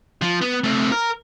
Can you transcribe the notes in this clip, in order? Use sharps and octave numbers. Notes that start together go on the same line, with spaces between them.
F3
B3
A3 C4
A#4